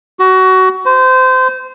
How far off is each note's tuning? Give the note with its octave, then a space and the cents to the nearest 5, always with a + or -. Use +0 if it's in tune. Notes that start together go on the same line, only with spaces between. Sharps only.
F#4 +20
C5 -25